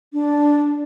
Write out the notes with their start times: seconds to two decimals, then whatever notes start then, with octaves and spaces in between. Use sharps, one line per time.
0.13 D4